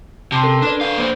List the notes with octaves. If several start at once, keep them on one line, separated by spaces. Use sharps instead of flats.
C3 A5 C6 C7
C#4 A4 A#4
D4 A4 B4 D5
D3 D4 F5
A#3 C5